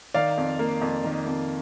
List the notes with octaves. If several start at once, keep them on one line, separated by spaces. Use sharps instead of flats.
D#3 D5 F5
F2
A#3
F2
D#3
F2